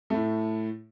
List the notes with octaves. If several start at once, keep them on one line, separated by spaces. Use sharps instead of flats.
A2 A3